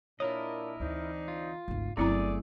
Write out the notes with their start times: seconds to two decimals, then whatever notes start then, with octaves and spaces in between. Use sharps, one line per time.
0.20 A#2 D4 E4 A#4 C#5 D#5
0.80 D2 E3 C4 D4 D#4
1.28 F4
1.68 G#1 D2
1.97 G1 F#3 A3 C4 E4 G#4 D5 A#5